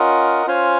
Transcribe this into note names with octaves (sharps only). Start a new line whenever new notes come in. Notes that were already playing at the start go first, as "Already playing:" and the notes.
Already playing: C#4 F4 A#4 D#5 F#5
C#4 F4 C5 F5 G#5